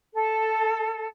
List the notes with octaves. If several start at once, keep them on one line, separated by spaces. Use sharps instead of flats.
A4